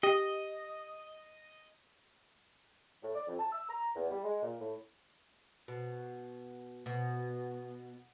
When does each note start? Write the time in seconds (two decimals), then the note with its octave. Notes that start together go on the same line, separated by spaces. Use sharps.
0.03 G4 D#5
3.02 A2
3.15 D5
3.27 F2
3.40 A5
3.52 E6
3.69 A#5
3.95 E2
4.10 G3
4.24 G#3
4.42 A#2
4.60 A2
5.68 B2
6.86 B2